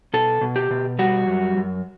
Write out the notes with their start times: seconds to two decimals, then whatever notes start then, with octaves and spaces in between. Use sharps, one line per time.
0.14 B2 A4
0.41 B2
0.56 G4
0.71 B2
0.99 G3 F#4
1.27 F#2
1.57 F#2